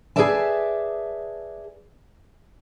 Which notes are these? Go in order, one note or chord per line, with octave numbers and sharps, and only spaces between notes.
G#4 A4 B4 D5 E5 A5